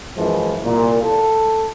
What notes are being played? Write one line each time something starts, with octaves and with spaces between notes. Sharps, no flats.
F#2 E3 F3 G#3
C2 A#2
A4